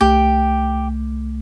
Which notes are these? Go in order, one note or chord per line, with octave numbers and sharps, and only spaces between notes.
C2 A3 G4 G6